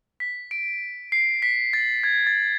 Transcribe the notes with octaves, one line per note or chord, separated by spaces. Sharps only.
B6
D7
C7
B6
A6
G#6
A6